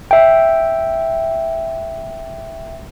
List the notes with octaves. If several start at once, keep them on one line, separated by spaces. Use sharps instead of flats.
E5 G5